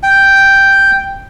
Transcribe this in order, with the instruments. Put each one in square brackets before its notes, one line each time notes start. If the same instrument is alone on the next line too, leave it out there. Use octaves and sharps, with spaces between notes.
[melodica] G5